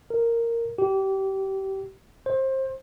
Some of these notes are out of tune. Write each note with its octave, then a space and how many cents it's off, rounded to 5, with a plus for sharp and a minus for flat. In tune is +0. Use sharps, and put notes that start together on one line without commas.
A#4 -10
G4 -25
C5 +25